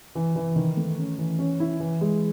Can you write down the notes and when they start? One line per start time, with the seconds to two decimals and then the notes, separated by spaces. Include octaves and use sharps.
0.15 E3
0.36 E3
0.56 D#3
0.77 A3
0.98 C#4
1.18 E3
1.39 C#4
1.60 E4
1.80 E3
2.01 G#3